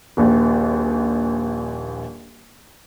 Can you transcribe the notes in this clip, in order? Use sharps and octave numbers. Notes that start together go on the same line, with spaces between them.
D#1 A#1